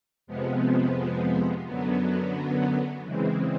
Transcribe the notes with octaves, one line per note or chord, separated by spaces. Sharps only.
F2 C3 F3 G#3 B3
F#2 D3 F#3 B3
C#3 E3 G#3 C4